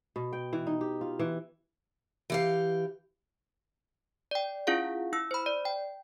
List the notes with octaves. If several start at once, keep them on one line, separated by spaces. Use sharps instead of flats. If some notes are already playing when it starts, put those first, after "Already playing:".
B2
G5
E3
D#4
G4
F4
E3
E3 G4 F5
D5 G5
C#4 E4 F4 G#4 F5 F#5
E4 E6
C5 B5
D5
G5